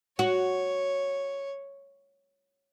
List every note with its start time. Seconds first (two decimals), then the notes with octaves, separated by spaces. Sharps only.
0.19 F#4 C#5